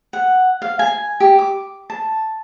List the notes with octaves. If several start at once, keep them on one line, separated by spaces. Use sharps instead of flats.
F#5
F5
G#5
G4
D6
A5